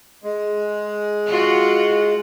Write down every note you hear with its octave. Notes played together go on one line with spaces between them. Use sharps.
G#3
F4 F#4